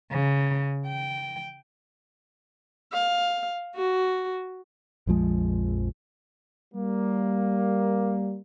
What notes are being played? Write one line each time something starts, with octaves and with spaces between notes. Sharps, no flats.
C#3
G5
F5
F#4
A#1 F2 F3 G#3
G3 A#3